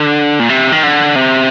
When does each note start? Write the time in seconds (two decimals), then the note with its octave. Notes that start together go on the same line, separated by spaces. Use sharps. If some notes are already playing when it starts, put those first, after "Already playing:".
Already playing: D3
0.40 A#2
0.49 C3
0.72 D#3
0.83 D3
1.16 C3